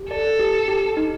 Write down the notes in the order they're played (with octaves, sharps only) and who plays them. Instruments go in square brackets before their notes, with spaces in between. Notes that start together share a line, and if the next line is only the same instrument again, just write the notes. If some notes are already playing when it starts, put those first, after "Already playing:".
Already playing: [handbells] G4
[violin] A4 [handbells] D5
[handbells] G4
G4
D#4